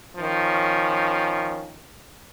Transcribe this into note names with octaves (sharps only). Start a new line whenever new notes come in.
D#3 F3 C#4